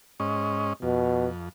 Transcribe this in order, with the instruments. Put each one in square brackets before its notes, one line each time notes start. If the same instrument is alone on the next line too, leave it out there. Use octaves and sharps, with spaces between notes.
[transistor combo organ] G#2 C#4 D#5
[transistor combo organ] F2 [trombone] B2